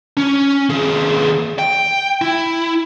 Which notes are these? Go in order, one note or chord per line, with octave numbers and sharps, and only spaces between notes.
C#4
D#2 G#4
G5
E4